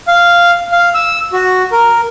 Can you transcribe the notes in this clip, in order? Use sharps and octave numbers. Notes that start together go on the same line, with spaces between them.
F5
F5
E6
F#4
A#4